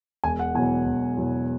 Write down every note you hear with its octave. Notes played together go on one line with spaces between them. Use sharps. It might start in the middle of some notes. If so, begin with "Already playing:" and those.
E1 G#5
F#5
E2 B2 F#3 G#5
E1
E2 B2 F#3